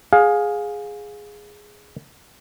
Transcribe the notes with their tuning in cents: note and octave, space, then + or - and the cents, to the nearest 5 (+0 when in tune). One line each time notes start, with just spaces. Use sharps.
G#4 +0 F5 +25